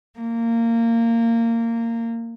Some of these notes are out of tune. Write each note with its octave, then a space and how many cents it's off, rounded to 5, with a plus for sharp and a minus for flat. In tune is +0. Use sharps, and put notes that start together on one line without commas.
A#3 -20